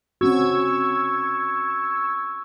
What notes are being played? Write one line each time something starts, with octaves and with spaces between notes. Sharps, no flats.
C4 C#4 F#4 C#6 E6 G#6